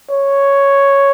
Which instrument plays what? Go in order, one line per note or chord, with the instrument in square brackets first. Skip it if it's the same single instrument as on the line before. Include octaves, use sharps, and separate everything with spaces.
[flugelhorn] C#5